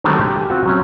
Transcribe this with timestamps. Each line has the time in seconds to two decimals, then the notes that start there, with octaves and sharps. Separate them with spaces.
0.04 D3 D#3 F#3 G3 A3 C4
0.21 G4
0.36 G4 G#5
0.50 C4 F4 F#4
0.66 F#3 C4 C#4